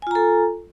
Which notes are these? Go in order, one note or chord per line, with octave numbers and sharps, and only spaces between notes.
F4 A4 G#5 A#5